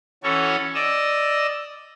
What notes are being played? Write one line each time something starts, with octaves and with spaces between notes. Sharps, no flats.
E3 C#4 F#4 A4 C#5
D5 D#5 E6